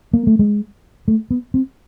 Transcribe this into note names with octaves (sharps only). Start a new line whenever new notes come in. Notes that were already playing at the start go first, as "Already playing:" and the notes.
A#3
A3
G#3
A3
B3
C4